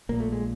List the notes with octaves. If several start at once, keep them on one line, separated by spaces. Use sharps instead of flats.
A#1 A#2 A#3
A3
G#3